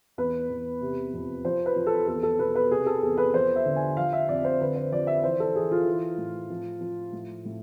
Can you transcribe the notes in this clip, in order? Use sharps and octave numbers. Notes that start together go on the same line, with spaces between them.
E2 B4
E2
C3
F2
F3 C5
B4
F3
A4
E2 A4
A4
B2 B4
B4
C3 G#4
A4
E2 G#4
B4
F3 C5
E5
D3
G#5
F3 F5
E5
F2 D5
C5
D3 B4
C5
F3 D5
E5
E3 C5
A4
E3 G#4
F4
E3
A2
F3
F3
A2
A2